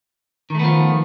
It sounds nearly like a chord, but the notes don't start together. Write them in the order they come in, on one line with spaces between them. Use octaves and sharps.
D#3 A3 B3 F3